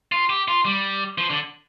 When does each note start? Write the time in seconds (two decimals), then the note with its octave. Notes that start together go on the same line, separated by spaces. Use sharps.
0.12 F4
0.30 G4
0.48 F4
0.65 G3
1.18 F3
1.30 D3